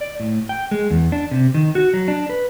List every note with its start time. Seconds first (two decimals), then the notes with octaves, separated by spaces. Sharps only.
0.01 D5
0.20 A2
0.49 G5
0.71 G#3
0.91 E2
1.12 D4
1.31 C3
1.54 D#3
1.75 F#4
1.94 F#3
2.08 D4
2.29 B4